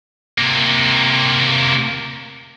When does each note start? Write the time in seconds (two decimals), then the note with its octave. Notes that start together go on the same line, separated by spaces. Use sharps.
0.38 C3 A#3